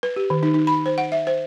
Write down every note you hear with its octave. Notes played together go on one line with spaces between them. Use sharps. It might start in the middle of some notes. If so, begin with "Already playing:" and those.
B4
G4
D#3
D#4
D#4
B5
C5
F#5
E5
C5